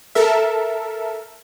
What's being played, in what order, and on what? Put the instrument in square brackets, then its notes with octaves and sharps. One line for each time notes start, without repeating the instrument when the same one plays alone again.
[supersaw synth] A4 A#4 E5